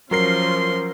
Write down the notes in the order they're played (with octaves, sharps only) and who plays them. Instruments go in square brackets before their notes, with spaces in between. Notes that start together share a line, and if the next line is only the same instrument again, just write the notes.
[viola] F3 C#4 [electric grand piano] F#3 A#4 C7 [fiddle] C6